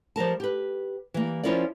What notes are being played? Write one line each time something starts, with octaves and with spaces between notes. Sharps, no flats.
F3 G3 A#4 A5
G4 B4
E3 G3 A#3
F3 C#4 E4 F4 A#4 D5